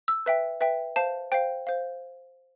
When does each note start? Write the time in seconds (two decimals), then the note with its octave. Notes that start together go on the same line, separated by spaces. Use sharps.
0.08 E6
0.26 B4 E5 G5
0.61 B4 E5 G5
0.96 C5 F5 A5
1.32 C5 F5 G5
1.67 C5 F5